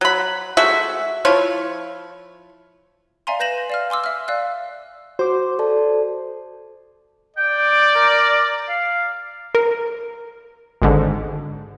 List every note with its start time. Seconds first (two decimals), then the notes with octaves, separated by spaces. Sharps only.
0.01 F#3 B5
0.57 G#3 A3 F#4 E5
1.25 F3 E4 F4 C#5
3.27 D5 E5 F5 G#5 A#5 C6
3.40 B4 G6 A#6 E7 F#7
3.70 D5 F5 F6
3.90 G#5 C6 D6 E6
4.04 E5 F6
4.28 D5 F5 E6 F#6
5.19 F#4 C5 D6
5.59 A4 D5 A5
7.37 D5 G5
7.95 A#4
8.68 F5
9.55 A#4
10.82 G#1 G#2 D3